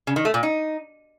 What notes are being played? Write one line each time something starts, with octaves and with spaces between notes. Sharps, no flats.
C#3
D#3
A3
A#2
D#4